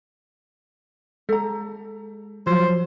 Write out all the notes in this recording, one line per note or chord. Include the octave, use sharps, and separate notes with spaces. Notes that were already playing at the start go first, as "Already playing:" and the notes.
G#3 A4 A#5
F3 F#3 C5